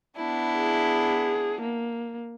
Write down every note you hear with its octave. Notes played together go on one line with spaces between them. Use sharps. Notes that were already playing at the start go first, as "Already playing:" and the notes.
B3 D4 E4
G#4
A#3